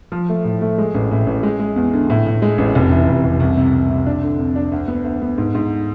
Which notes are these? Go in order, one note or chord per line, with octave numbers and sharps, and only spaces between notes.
F3
A3
A2
A3
G#3
A1
A2
A1
G#3
G#3
E2
D3
A2
A2
G#3
A1
F1
E3
F1
F1
C2
C3
C2
C3
D4
D3
F2
D4
D2
B3
D2
B3
G#2
G#2